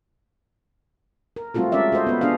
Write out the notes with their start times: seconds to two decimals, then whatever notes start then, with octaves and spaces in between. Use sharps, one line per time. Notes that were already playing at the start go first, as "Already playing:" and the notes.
1.36 A#4
1.54 G3 A3 C4 F4 F#4 A4
1.72 G#3 C#4 A#4 D5 E5
1.92 F#4 A4 C5 D#5
2.07 B3 B4
2.21 B3 D4 G#4 D#5 F5